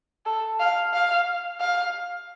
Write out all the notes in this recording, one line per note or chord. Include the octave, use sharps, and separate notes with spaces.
A4
F5
F5
F5